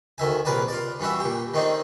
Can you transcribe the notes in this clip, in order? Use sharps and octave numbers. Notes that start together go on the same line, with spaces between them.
D2 D#3 E5 G#5
A#1 C3 A#4 B4 D5 G#5
F4 D5
G2 E3 C#4 F#4 E5
A#2 G4
D#3 A3 C4 D4 D#4